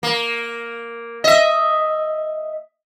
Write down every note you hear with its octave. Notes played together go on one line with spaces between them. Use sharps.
A#3
D#5 E5